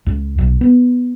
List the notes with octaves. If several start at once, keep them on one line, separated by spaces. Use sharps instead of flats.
C#2
B1
B3